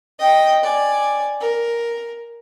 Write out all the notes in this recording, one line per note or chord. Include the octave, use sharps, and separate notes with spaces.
D#5 G5
D5 G#5
A#4